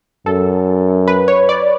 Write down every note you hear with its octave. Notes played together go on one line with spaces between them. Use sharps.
F#2 A4
B4
C#5
D5